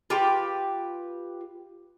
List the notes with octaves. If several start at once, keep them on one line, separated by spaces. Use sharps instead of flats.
F4 G4 B4 G5